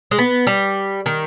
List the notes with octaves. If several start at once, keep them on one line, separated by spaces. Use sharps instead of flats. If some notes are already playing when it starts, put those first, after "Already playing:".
G#3
B3
G3
D#3